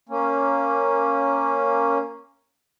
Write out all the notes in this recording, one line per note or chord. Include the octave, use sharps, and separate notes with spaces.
A#3 C#4